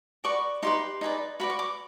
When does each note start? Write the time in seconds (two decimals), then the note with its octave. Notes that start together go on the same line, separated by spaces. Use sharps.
0.24 F#4 B4 D5 C#6
0.62 D#4 G4 B4 C6
1.01 D#4 G#4 B4 D5
1.40 F#4 B4 D5 B5
1.50 C#6
1.59 D6